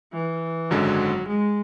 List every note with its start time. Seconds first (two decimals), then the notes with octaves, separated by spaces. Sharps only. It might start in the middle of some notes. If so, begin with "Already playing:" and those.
0.13 E3
0.70 G#1 F#2 D3 F#3 G#3
1.28 G#3